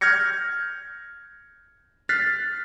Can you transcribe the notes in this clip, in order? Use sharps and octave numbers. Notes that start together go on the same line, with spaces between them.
F6 G6 G#6 A#6 C#7
F6 F#6 A6 B6 C7